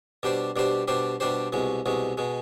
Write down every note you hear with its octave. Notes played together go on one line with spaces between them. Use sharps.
B2 G3 D4 G4 C5
B2 G3 D4 G4 C5
B2 G3 D4 G4 C5
B2 G3 D4 G4 C5
C2 B2 G#3
C2 B2 G#3
B2 G#3